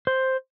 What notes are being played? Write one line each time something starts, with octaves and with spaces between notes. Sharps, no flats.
C5